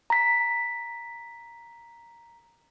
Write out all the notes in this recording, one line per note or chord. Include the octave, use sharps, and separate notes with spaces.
A#5 B6